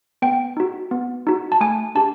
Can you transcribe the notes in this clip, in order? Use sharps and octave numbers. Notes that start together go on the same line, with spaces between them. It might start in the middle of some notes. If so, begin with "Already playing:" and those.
B3 G5
D#4 F#4
B3
D#4 F#4
A5
A3 G#5
D4 G4 A5